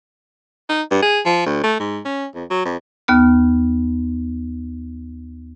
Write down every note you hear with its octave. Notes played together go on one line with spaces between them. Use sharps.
D#4
G2
G#4
F3
D2
A3
G#2
C#4
F2
F#3
F2
D#2 B3 F6